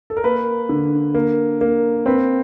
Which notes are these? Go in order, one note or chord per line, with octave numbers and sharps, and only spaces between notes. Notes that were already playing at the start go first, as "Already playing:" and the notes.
A4
A#4
A#3 B4
D3
A#3
A#3
C4 B4